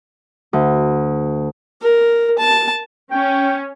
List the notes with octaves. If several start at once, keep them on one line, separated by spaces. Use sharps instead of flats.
D2
A#4
A5
C#4 G5